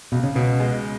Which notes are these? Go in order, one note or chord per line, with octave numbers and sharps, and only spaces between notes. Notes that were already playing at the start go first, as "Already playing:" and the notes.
C#2 B2
C#3
C#2 B2
G#3